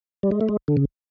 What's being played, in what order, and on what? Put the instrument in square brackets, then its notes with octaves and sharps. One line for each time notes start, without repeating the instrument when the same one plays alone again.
[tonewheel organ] G3
G#3
A3
G#3
D3
C#3